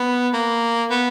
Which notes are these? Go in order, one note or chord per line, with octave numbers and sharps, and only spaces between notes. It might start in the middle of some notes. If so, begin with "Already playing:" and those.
Already playing: B3
A#3
B3